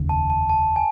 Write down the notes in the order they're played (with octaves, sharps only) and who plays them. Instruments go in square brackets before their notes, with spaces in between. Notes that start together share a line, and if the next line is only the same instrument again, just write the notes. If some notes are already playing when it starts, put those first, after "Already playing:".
Already playing: [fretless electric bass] F1 D#2 C#3
[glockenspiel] A5
A5
A5
G#5